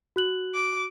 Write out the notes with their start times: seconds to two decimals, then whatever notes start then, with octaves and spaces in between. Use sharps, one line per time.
0.16 F#4 F#6 F#7
0.55 D6